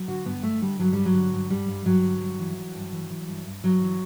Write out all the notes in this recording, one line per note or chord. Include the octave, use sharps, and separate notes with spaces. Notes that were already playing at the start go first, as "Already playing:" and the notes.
Already playing: F#3
D3 F#4
G2 B3
D3 A3
D3 G3
G2 F#3
G2 G3
F#3
D3
G2
G2 G3
G2
G2 F#3
D3
G2
E3
E3
G2
E3
E3
G2
G2
G2 F#3
E3